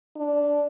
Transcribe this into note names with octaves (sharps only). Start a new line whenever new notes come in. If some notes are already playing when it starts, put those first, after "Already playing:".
D4